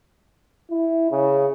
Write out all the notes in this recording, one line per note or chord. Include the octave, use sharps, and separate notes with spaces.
E4
C#3